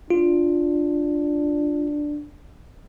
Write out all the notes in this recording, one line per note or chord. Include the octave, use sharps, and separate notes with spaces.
D4 F4